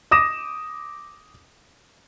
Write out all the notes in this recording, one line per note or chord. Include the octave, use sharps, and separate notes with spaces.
D6 D#6 A#6 E7